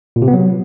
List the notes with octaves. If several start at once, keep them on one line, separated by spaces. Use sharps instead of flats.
A#2
C3
B3
F#3